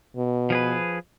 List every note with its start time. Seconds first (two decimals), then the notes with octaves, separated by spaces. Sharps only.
0.16 B2
0.50 F3 G#4 B4